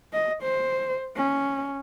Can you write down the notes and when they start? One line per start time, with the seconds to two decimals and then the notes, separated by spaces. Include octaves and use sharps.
0.13 D#5
0.43 C5
1.16 C#4